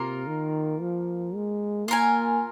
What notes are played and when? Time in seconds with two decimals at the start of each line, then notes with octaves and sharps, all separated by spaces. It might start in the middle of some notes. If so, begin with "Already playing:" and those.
Already playing: C3 A#3 F4 A#4
0.27 D#3
0.81 F3
1.35 G#3
1.88 A#3 F4 A#4 G#5